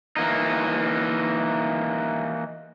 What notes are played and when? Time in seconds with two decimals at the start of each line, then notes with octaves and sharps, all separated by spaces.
0.16 E3 A#3 D#4